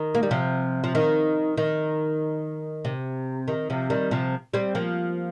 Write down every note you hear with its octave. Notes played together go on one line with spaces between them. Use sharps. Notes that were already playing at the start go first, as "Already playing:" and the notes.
Already playing: D#3
A#3
G3
C3 F3
F3
D#3
D#3
C3
D#3
C3 F3
D#3 G3
C3 F3
G3 C4
F3 A#3